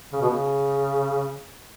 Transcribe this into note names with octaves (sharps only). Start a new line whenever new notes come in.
C#3
B2
C#3